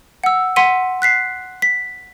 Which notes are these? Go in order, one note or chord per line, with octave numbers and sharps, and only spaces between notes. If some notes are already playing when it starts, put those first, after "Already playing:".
F#5 E6
F#5 C6 B6 D#7
F#6 B6 C7
B6